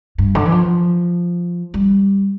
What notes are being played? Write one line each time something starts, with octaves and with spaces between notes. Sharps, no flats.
G2
D3
E3
F3
G3